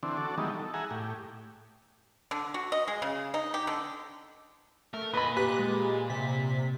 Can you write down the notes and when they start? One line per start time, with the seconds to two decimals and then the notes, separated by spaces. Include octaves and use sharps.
0.03 D3 E3 C4 D4
0.17 F#4 A4 D5
0.38 D#3 E3 G3 G#3 B3 D#4
0.55 A4
0.74 G#4 E5 F#5 G#5 A#5
0.91 A2 G4
2.31 D3
2.54 F#4
2.72 D#5
2.88 G#3
3.02 C#3
3.34 D#4
3.54 G4
3.67 D3
4.94 A3 A#4
5.13 A#2 B4 D#5 B5
5.37 G4 B4 F#6
5.59 G#3
6.10 C3 B6